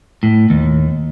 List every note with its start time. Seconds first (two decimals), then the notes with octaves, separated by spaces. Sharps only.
0.23 A2
0.50 D#2